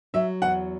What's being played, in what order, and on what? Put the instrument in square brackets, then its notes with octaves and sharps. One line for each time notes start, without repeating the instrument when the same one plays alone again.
[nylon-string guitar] F#3 [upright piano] E5
[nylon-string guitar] E2 [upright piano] F#5